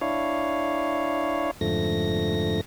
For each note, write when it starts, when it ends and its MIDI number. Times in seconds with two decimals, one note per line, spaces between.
0.01 1.51 62
0.01 1.51 64
0.01 1.51 73
0.01 1.51 77
1.61 2.61 41
1.61 2.61 44
1.61 2.61 50
1.61 2.61 53
1.61 2.61 57
1.61 2.61 94